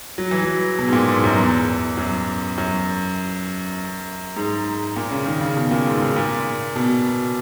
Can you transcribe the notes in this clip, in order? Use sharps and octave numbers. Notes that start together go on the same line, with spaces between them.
F#3
E3
F#3
B2
G#2
A#2
G#2
F#2
E2
F#2
F#2
G#2
A#2
C#3
D#3
C#3
B2
A#2
G#2
G#2
A#2
B2